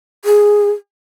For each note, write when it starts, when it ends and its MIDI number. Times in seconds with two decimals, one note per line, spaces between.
0.25 0.71 68